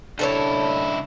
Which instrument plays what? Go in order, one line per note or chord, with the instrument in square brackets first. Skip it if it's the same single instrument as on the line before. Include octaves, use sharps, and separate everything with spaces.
[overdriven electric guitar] C#2 E4 [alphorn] D4 [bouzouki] A4 B4 C#5